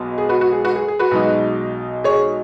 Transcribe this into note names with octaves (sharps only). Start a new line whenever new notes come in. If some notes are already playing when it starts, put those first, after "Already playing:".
Already playing: B1 B2 G#3 B3
G#4
F#4 B4
F#4
G#4
F#4 B4
G#4
G#4
F#4 B4
B1 B2 G#3 D#4
G#4 C#5